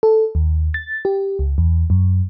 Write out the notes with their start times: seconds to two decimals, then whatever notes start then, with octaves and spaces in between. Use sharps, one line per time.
0.03 A4
0.35 D#2
0.74 A6
1.05 G4
1.39 C#2
1.58 E2
1.90 F#2